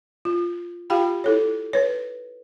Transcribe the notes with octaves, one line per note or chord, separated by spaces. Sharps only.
F4
F4 G4 F5 G5 B5
E4 A4 C#5
B4 C#5